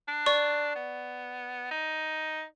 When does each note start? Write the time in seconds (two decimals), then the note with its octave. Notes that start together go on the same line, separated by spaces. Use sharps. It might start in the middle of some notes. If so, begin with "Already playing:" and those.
0.08 D4
0.26 D5 C#6
0.76 B3
1.71 D#4